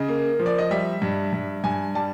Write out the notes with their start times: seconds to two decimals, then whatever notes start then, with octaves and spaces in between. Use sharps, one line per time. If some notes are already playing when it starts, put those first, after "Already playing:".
Already playing: C#3 D#5
0.08 A#3
0.39 F3
0.46 D5
0.58 D#5
0.71 G3 E5
1.02 G2
1.33 G2
1.64 G2 G#5
1.95 G3 A5